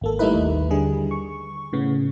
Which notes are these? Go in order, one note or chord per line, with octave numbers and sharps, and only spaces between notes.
G#1 A#3 A4
G3 A3 A#3 D#4 E4 B4
D#2
D3 G3 G#4
C#6
A2 C#3 B3